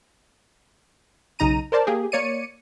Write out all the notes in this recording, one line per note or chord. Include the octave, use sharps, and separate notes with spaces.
B1 C#3 D#4 A#5 D#7
A#4 C5 D5 A5
A#3 G4 G#4
A#3 C#5 D5 C#7 D#7